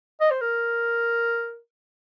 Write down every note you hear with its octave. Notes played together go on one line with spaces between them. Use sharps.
D#5
C5
A#4